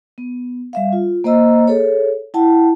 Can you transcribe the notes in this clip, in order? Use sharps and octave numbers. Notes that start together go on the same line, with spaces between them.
B3
G3 E5 F5
F4
A#3 C5 D#5 A#5 E6
G#4 A4 C#5
E4 F#5 G5 A5